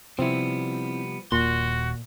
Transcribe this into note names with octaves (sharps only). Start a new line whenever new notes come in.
C3 F3 G3 B3 C4 E4
D#1 A#2 F#4 C6